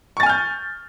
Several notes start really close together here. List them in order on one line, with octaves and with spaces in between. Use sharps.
C#6 A6 G#5 F6 G6